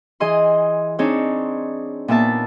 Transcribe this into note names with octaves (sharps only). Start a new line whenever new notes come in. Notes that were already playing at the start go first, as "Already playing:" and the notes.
E3 G#4 D#5 C6
C4 D4 D#4 G#4 C#5
A#2 B3 E5 A5